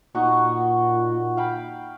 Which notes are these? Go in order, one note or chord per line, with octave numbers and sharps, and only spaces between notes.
A#2 D#4 F#4 C#6
F5 G5 B5